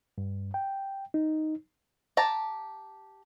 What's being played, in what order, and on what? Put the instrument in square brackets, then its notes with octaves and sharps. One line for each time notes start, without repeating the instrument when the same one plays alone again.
[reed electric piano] G2
G5
D#4
[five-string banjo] G4 A5 A#5